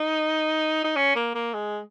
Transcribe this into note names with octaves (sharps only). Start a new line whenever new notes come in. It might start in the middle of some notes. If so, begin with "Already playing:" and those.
Already playing: D#4
D#4
C#4
A#3
A#3
G#3